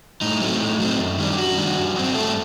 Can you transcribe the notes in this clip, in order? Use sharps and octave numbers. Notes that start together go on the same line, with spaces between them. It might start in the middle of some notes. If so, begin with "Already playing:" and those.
A2 D#4
F#3 A3 C4
A2
F#3 A3 C4
F#2
D#3 G3 D4
F#2 F#4
D#3 G3 D4
G2
F#3 C4
G2 A3 A4